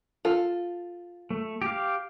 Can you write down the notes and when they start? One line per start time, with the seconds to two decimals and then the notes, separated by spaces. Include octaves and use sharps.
0.25 F4 A4
1.30 A3
1.62 G4 F5